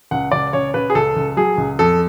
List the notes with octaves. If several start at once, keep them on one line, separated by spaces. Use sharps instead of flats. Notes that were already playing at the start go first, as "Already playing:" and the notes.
C#2 F#5
C#2 D5
C#3 C#5
C#3 B4
G#4
C#2 A4
C#2
F#3 G#4
C#2
F2 A4